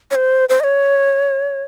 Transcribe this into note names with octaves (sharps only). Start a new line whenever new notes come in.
C#5
C5
C5
D#5
C#5